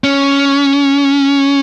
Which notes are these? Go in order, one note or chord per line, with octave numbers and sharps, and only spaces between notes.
C#4